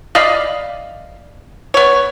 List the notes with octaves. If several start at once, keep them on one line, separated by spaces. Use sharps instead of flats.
D5 D#5 F5 B5
B3 C#5